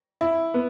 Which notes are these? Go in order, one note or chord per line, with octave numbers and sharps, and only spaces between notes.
E4
B3